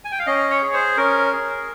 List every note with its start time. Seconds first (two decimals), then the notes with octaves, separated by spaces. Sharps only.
0.05 G#5
0.12 G5
0.19 F5
0.27 C#4 D#5
0.50 C#5
0.62 G#4
0.74 C5
0.97 C#4 A#4
1.33 G#4